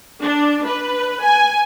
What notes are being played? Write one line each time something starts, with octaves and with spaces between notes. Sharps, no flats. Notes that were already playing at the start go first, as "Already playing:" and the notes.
D4
B4
G#5